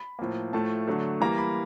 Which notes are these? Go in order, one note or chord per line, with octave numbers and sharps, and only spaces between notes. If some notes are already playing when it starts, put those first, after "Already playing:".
Already playing: B5
A2 F3 A#3
A2 F3 A3 A5
D3 F#3 A3
E3 G3 A#3 A#5
B5